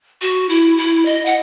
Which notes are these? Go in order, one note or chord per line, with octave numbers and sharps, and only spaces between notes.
F#4
E4
E4
D#5
F#5